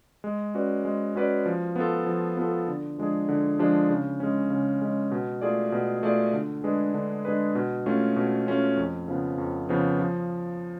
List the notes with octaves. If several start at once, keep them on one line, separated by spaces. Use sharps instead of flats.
G#3
C#4 F#4 B4 D5
G#3
C#4 F#4 B4 D5
F3
B3 F4 A4
F3
B3 F4 A4
D3
F3 G#3 D4 G#4
D3
F3 G#3 D4 G#4
C#3
G#3 C#4
C#3
G#3 C#4
B2
A3 F4 G#4 D5
B2
A3 F4 G#4 D5
D3
G#3 D4 G#4 B4
D3
G#3 D4 G#4 B4
B2
A3 C#4 F4
B2
A3 C#4 F4
F2
C#3 F3 B3
F2
C#3 F3 B3
F3